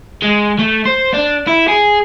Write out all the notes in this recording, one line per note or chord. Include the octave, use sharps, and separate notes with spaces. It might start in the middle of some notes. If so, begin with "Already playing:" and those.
G#3
A3
C5
D4
E4
G#4